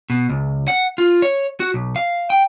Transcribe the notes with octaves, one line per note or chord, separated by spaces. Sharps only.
B2
C#2
F#5
F4
C#5
F#4
B1
F5
G5